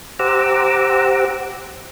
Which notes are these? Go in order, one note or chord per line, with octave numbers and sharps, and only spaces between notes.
G4 C5 F#5 A#5 D6 E6